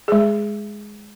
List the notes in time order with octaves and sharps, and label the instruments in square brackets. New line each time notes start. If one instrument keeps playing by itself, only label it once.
[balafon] G#3 G#4